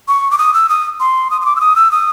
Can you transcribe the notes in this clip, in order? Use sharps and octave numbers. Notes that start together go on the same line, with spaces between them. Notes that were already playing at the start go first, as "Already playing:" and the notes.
C#6
D6
D#6
E6
D#6
C6
D#6
D#6
D6
E6
D#6
E6
D#6